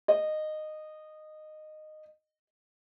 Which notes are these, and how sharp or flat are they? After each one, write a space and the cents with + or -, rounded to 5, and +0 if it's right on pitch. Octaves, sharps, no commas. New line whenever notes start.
D#5 -15